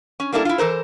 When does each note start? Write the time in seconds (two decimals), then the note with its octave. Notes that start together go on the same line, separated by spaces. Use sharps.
0.20 C#4
0.32 G3 A#3 D4 E4 A4
0.45 E4 F4
0.58 E3 A4 A#4 C5